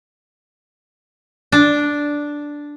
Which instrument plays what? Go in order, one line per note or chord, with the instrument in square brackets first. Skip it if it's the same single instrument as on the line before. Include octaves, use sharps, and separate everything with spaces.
[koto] D4